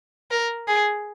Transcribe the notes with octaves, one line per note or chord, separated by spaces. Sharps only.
A#4
G#4